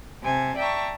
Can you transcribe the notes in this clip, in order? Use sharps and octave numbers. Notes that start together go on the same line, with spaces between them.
C3 C5 G#5 A5
D5 E5 G5 A5 A#5 C#6